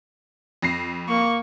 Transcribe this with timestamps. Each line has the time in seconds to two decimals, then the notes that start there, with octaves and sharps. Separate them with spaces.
0.63 F2 A#6 C7
1.09 A#3 C#6